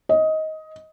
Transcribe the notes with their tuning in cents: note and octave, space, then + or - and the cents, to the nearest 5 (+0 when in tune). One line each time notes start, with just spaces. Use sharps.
D#5 +15